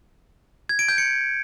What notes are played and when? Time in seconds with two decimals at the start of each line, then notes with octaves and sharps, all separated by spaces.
0.69 G#6
0.79 D7
0.88 G6
0.98 C#7